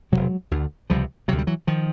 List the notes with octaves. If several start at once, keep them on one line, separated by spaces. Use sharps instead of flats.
E1 E2 C3 F#3 G#3
D2 D3
C#2 C3 F3 G3
D2 C3 F#3
G3
E3 F#3
D#3 F3